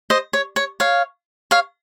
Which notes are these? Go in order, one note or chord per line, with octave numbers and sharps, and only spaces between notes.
C5 D#5
C#5
C#5
C#5 F5
C#5 F5